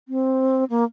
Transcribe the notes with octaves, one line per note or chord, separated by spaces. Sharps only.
C4
A#3